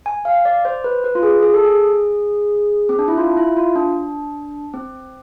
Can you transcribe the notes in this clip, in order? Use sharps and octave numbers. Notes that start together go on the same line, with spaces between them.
G#5
F5
D5
C5
B4
B4
F4
G#4
G#4
A4
G#4
C4
D4
E4
F4
E4
F4
D4
C4